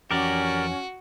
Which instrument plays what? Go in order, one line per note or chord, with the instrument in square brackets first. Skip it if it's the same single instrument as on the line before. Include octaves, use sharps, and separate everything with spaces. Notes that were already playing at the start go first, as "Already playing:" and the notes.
[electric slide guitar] F2 E3 [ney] C#4 [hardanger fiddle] F#4 [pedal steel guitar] G4 A#4 D5